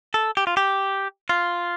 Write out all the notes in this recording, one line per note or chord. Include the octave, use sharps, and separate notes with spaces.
A4
G4
F4
G4
F4